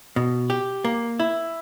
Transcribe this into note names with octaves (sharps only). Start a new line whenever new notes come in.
B2
G4
A#3
E4